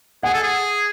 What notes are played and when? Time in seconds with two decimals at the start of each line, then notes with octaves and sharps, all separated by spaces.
0.23 G#4 F#5 G#5
0.33 A4
0.43 G#4